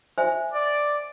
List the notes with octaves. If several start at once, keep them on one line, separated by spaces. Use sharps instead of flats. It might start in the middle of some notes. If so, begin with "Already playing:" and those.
C5 E5 G#5
D5